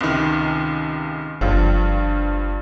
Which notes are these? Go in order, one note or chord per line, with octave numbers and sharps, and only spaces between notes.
C#2 C3 D#3
F#1 G2 F3